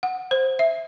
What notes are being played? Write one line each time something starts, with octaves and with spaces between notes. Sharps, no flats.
F#5
C5
E5